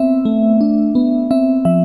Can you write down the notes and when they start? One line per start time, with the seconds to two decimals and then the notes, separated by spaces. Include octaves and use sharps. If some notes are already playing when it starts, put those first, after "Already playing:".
Already playing: B3 C4 E5
0.25 A3
0.61 D4
0.95 B3
1.31 C4 E5
1.65 F3 E5